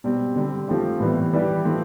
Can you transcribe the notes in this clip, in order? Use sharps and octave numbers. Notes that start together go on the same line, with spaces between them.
B2 G3 C4
D3 G3 C4
F3 A3 C4 G4
A2 E3 G3 B3
E3 G3 D4 G4
F3 A3 C4